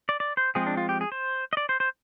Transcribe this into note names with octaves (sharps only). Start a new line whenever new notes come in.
D5
D5
C5
F3 G#3 C4 G#4
D4
F4
G4
G#4
C5
D#5
D5
C5
C5